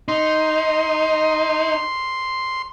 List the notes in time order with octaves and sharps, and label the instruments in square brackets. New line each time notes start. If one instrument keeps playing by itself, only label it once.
[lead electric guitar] D#4 [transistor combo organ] C6